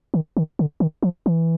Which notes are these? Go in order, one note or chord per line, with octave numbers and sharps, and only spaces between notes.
D#3
D#3
D3
D#3
F3
E3